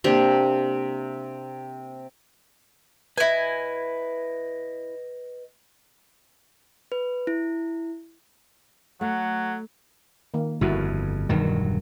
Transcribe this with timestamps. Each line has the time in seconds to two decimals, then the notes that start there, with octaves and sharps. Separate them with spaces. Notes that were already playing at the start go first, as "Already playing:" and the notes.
0.04 C3 A#3 D4 G4
3.17 E4 B4 D#5 G#5
6.92 B4
7.27 E4
9.01 F#3 A3 A4 F#5
10.34 D#3 A#3
10.61 G1 F2 E4 F#4
11.29 E1 G2 D#3 F#3